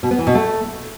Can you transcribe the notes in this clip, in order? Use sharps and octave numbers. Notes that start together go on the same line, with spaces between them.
B2
B3
E3
B2
A3